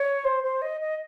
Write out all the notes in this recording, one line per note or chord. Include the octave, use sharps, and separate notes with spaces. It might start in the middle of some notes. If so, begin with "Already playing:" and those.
Already playing: C#5
C5
C5
D#5
D#5